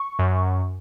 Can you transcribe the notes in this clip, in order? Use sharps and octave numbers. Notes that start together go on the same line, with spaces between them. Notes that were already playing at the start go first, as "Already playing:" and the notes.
Already playing: C#6
F#2